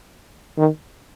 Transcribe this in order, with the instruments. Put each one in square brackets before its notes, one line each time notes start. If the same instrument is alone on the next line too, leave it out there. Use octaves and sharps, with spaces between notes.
[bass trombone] D#3